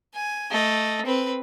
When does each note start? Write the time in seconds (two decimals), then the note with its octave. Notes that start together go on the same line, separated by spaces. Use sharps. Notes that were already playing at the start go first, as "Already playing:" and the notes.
0.14 G#5
0.51 A3 D#5
1.06 C4 B4